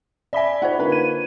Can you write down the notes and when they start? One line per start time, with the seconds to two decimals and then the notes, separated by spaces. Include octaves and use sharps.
0.33 D5 E5 G#5 B5 B6
0.62 D#4 F4 C5 F#5
0.79 D3 A#3 B4
0.92 G#6 D#7